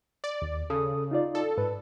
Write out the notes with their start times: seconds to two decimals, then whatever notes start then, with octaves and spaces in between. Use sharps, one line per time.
0.24 D5
0.42 D#2
0.70 C#3 A4 D#6
1.11 D#4 F4 D5
1.35 A4
1.58 G#2 B4